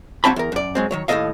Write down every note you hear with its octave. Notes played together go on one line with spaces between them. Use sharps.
F#3 A#3 C4 C#5 A5 B5
E2 A#4
F#2 D5
F#3 G#3 C4
D#3 F#3 C#5
D#2 A2 F#3 A4 D#5 F5